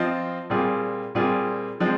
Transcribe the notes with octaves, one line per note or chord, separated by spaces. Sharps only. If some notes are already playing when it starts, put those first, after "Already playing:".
Already playing: F3 C4 F4 C5 D#5
A#2 G3 C4 F4 G#4
A#2 G3 C4 F4 G#4
F3 G#3 C4